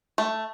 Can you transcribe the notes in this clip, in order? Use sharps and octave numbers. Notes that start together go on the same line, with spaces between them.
A3